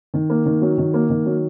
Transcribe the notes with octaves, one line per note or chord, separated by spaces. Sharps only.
D#3
A#3
D#3
F#3
D#3
A#3
D#3
F#3